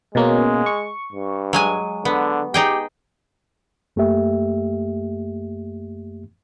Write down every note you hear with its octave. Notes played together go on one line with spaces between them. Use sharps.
B2 G#3 A#3 C#4
C#6
G2
F#3 G#3 G#5
D3 B3
D#4 G4 G#4 G5
F#2 A3 A#3 G4 E5